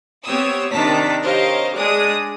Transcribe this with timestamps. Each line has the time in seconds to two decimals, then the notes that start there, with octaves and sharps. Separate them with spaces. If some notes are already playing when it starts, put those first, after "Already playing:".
0.24 B3 C4 G4 C#5 D#6 E6
0.72 C3 D#3 D4 A5 A#5 B6
1.23 G4 A#4 C5 C#5 D#5 F5
1.75 G#3 D4 G#4 D#6